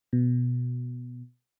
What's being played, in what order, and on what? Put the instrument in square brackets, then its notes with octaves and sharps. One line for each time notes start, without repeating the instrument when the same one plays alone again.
[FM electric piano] B2